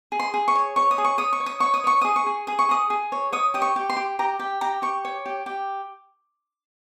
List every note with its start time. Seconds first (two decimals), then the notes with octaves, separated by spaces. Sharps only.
0.12 G#4
0.20 C6
0.34 G#4
0.48 C#6
0.55 C#5
0.76 C#5 C#6
0.91 D#6
0.98 G#4
1.05 C#6
1.18 C#5 D#6
1.33 C#6
1.40 C#5
1.46 D#6
1.60 C#5 C#6
1.74 D#6
1.84 C#5 C#6
2.01 G#4 D#6
2.16 C#6
2.26 G#4
2.47 G#4 D#6
2.59 C#6
2.69 G#4 D#6
2.90 G#4
3.12 C#5
3.32 C#5 D#6
3.54 G4 D#6
3.62 C#6
3.76 G4
3.90 C6
3.97 G4
4.19 G4 A#5
4.39 G4
4.61 G4 A#5
4.82 G4 C#6
5.05 C#5
5.26 G4
5.46 G4